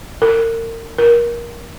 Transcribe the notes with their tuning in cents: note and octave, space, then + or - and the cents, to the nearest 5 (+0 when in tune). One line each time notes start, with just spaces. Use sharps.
A#4 -35
A#4 +20